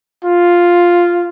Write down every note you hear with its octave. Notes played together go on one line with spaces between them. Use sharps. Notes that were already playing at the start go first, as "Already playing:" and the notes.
F4